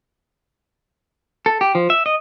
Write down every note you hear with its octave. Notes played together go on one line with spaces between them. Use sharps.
A4
G4
F3
E5
D#5